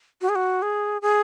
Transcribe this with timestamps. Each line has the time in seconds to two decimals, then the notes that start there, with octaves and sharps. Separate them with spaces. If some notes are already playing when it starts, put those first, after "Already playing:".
0.21 F#4
0.29 G#4
0.35 F#4
0.62 G#4
1.02 G#4